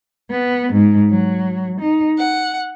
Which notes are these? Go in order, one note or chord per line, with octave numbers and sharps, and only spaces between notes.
B3
G#2
F#3
D#4
F#5